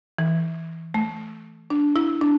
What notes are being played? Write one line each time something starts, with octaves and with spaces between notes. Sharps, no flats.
E3
A3
D4
E4
D4